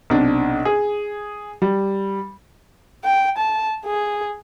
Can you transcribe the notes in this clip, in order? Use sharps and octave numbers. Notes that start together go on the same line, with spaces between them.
B1 C3 D4
G#4
G3
G5
A5
G#4